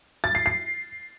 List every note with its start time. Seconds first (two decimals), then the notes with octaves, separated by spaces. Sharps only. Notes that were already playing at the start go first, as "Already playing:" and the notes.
0.24 A6
0.35 C7
0.46 C7